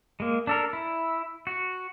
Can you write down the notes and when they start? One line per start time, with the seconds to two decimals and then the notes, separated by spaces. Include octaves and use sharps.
0.20 G#3 A#3
0.47 D4 A4 A#4
0.73 E4
1.47 F#4